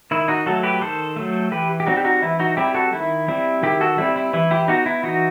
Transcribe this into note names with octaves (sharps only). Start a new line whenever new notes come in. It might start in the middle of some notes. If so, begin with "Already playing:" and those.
D#3 E4
D#4 F#4
F#3 A3 F#4 A4
G4 B4
D#3 A4 C5
F#3 A3
E3 G4 B4
G4
G3 C4 D#4 F#4
G4
D#4 F#4
E3 E4
D#4 F#4
G3 C4 E4 G4
F#4 A4
D#3 E4
G3 C4 E4
D#3 E4 G4
F#4 A4
G3 C4 E4
E4
E3 E4
E4 G4
B3 D#4 F#4
E4
E3 D#4 F#4